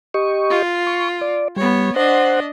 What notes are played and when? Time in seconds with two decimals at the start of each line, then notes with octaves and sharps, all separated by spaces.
0.14 G4 D#5 C#6
0.50 F4
0.87 C#6
1.21 D5
1.56 G3 B3 C#5
1.96 D4 C5 D#5 F#5